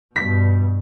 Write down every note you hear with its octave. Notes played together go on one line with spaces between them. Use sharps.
G2 B2 B6